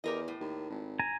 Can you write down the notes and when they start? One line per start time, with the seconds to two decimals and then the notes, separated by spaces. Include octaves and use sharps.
0.04 E2 G4 A#4 D#5
0.28 A2
0.40 D#2
0.70 G#1
1.00 G#5 A#5